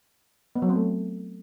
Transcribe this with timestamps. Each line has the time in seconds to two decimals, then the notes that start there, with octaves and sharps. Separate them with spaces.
0.56 B3
0.62 F#3
0.69 C4
0.76 A3